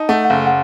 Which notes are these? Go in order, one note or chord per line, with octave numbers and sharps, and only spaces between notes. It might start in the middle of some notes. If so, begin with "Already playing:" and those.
Already playing: D#4 A5
A3 F#5
F#5
F#1 F5
F#5